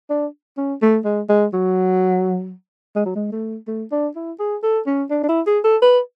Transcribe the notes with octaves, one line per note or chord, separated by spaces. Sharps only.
D4
C#4
A3
G#3
G#3
F#3
G#3
F#3
G#3
A3
A3
D4
E4
G#4
A4
C#4
D4
D4
E4
G#4
A4
B4